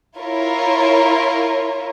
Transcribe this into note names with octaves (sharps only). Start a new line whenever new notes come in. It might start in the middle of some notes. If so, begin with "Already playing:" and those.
E4 F4 A#4 C#5